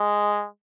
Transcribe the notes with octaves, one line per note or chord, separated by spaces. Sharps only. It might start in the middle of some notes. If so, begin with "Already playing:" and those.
Already playing: G#3